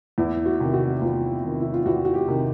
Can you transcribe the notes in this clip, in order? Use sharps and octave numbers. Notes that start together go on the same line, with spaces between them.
E2 E4
F#4
C3 D#3
F#4
E2 F4
C3 D#3
E4
F4
E2 F#4
F#4
G4
C3 D#3